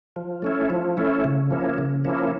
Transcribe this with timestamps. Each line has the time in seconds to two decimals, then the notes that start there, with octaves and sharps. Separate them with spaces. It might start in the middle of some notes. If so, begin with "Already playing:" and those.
0.16 F3
0.42 A3 C#4 E4
0.70 F3
0.97 A3 C#4 E4
1.24 C#3
1.51 F3 A#3 C#4 E4
1.78 C#3
2.04 F3 A#3 C#4 E4